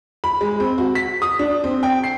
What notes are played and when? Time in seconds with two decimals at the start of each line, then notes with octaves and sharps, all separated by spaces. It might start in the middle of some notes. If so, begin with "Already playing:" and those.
0.24 B5
0.41 G#3
0.60 C4
0.78 F#4
0.95 B6
1.22 D#6
1.39 D4
1.64 C4
1.83 G5
2.04 C7